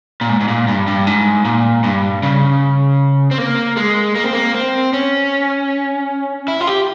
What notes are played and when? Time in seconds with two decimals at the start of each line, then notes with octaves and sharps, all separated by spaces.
0.21 A#2
0.29 G#2
0.40 G#2
0.48 A#2
0.68 G2
0.87 G2
1.07 G#2
1.45 A#2
1.84 G2
2.23 C#3
3.31 C4
3.38 A#3
3.77 G#3
4.15 A#3
4.24 C4
4.33 A#3
4.54 C4
4.93 C#4
6.48 E4
6.61 F4
6.67 G4